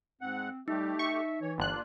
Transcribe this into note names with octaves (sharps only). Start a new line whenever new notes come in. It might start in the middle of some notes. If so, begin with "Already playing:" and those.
G#2 C4 F#5
G3 A3 D#4 G4
E5 C#6
E3 C#5
G1 A#3 D4 F4 F#6